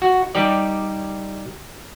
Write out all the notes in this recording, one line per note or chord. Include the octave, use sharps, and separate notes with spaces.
F#4
G3 D#4 G4 D5